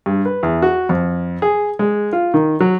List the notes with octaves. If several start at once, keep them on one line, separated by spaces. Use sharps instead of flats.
G2
B4
E2
F#4
F2
G#4
G#3
F4
D#3
F#3